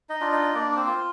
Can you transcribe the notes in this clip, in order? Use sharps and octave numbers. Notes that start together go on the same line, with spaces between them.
D#4 D#5
D4 F4
D#4 D#5
A#3 D4 D5
D5
C4 C5
F4